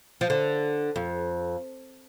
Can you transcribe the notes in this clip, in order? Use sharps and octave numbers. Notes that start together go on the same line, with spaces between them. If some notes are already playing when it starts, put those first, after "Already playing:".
F3
D3
F2